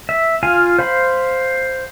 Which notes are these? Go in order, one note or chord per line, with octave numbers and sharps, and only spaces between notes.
E5
F4 F5 G#5
C5 F5 B5